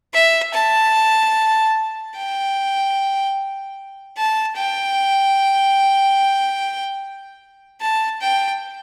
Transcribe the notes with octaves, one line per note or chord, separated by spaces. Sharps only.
E5
A5
G5
A5
G5
A5
G5